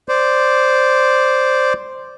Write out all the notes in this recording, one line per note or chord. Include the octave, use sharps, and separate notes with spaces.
C5 D5